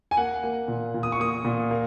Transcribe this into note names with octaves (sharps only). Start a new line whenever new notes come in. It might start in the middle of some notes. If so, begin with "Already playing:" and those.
G#5
A#3 F#5
A#3
A#2
A#2
D#6
C#6
A#3 D#6
A#2
A#3